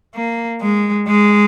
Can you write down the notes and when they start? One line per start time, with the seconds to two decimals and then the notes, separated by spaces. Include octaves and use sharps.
0.16 A#3
0.62 G#3
1.08 G#3